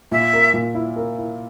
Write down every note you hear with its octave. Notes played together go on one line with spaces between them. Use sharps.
A#2 E5
A#4
A#2
E4
A#4
E4